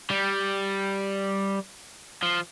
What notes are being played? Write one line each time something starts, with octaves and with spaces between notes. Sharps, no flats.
G3
F3